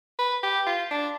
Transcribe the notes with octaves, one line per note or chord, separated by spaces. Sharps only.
B4
G4
F4
D4